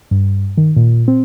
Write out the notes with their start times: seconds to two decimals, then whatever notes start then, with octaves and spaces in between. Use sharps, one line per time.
0.11 G2
0.57 D#3
0.76 A#2
1.08 C4